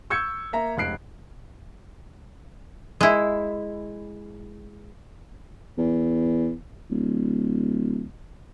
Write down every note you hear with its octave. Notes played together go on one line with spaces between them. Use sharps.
C#6 E6 G6 G#6 C#7
A#3 E5 A#5
F1 C#2 F#6 C7 D7
G#3 E4
E2
D1